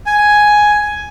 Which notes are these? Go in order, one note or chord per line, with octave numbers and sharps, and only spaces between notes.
G#5